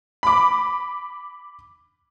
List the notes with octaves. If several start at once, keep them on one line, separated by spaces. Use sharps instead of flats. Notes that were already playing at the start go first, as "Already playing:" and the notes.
B5 D6